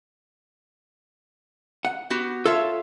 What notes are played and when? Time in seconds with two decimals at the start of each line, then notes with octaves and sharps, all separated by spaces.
1.85 F#5
2.10 B3 F#4 G4
2.46 F4 A4 C#5 E5